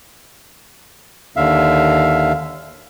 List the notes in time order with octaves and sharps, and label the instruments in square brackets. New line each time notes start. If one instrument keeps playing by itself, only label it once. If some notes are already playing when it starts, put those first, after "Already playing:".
[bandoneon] D#2 D3 E5 F5